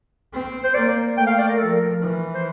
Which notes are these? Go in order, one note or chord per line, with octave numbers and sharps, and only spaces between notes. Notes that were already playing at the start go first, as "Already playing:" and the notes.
C4
C5
A#3 D5
A3 G5
F5
D5
A#4
F3 A4
A#4
E3
C5